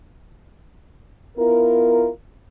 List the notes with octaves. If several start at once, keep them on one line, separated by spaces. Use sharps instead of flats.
B3 E4 F4 A#4